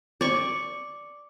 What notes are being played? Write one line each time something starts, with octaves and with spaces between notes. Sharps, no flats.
D5 C#6